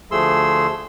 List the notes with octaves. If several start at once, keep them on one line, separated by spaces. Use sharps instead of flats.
D2 F3 A3 G#4 C6 E6